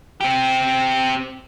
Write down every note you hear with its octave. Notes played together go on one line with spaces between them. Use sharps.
C4 G4